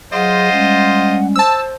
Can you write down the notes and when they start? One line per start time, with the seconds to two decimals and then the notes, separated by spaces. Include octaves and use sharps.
0.13 F#3 F4 G#4 C5 D#5 F#5
0.52 G3 G#3 C#4
1.36 C5 A5 E6